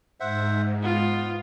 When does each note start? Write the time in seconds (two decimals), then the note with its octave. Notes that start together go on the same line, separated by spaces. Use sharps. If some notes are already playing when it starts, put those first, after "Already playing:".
0.20 G#2 C5 E5 F#5
0.83 B3 F4